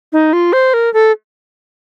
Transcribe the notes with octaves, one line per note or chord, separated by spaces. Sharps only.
D#4
F4
C5
A#4
A4